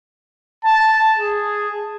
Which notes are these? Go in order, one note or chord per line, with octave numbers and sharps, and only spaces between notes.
A5
G#4